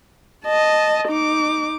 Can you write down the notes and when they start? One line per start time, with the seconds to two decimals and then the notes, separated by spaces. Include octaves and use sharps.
0.46 D#5 A5
1.08 D#4 D6